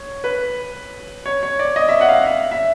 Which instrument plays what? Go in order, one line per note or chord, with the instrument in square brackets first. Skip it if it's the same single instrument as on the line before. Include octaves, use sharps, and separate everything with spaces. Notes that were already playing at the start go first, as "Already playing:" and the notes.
Already playing: [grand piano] C#5
B4
C#5
C#5
D5
D#5
E5
F#5
F5
F#5
E5
E5